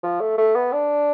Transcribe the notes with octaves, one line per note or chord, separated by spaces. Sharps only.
F3
A3
A3
B3
D4